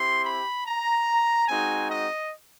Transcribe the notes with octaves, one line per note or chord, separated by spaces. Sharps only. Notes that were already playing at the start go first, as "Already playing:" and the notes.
Already playing: C4 E4 G4 C6
B5
A#5
G#3 C4 D#4 F#4 G#5
D#5